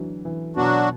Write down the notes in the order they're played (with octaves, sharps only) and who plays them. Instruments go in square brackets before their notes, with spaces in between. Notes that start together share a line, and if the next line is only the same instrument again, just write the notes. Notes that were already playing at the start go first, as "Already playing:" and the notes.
Already playing: [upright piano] D3 E3 F#3
E3
[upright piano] B2 [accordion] F#3 D4 F#4